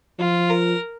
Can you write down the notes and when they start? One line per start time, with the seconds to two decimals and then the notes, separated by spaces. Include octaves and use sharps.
0.19 F3 F4
0.50 A#4